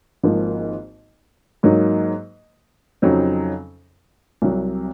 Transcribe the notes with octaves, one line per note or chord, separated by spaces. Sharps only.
G#1 G#2 F3 A#3
G#2 F#3 A#3 D#4
F2 C#3 F#3 C4 D#4
C2 C3 F#3